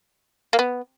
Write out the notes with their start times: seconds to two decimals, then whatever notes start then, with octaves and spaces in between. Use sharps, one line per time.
0.53 A#3
0.59 B3